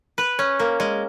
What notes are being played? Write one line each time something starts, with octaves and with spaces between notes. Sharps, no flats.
B4
C#4
A#3
G#3